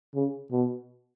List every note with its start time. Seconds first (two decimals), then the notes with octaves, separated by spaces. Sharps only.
0.15 C#3
0.51 B2